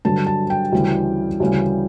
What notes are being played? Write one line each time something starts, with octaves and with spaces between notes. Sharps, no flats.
G2 D3 F#3 A5
A5
G5
D2 C#3 E3 G3
D2 C#3 E3 G3